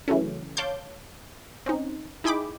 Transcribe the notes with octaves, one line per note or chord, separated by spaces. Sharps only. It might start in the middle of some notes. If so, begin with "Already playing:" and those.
C#3 E3 F#3 A3 C#4
C#5 F5 A5 C6 D6 G6
C4 C#4 D#4
D#4 E4 G#4 G5 B5 D6